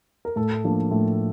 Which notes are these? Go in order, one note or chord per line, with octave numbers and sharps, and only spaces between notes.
A#4
A2 A4
F3 A#3 D4
A2